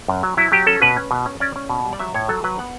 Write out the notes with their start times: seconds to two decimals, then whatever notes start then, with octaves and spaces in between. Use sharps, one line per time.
0.08 F#2
0.23 F#3
0.37 F#3 E4
0.52 F#3 G4
0.67 C#4 A4
0.82 B2 B4
0.97 C#4
1.11 B2
1.26 C#4
1.40 C#4 D5
1.56 C#4
1.69 B2
1.84 G3
1.93 D5
1.99 F#3 E5
2.14 A2 C#5
2.29 F#3 A4
2.44 F#3 B4
2.58 B3 F#5